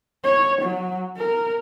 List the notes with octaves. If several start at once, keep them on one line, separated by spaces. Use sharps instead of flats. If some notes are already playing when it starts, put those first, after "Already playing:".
C#5
F#3
A#4